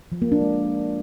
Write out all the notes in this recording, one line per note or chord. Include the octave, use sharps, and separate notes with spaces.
F3
A#3
D4
G#3